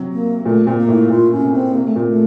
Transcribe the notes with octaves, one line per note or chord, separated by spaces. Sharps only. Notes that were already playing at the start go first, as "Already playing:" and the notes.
Already playing: C3 F#3
A#3
A#2 A3
A#2 C4
A#3
A2
A#2 F4
C#4
C3
C4
C3 A#3
A3
A#2 A#3
A3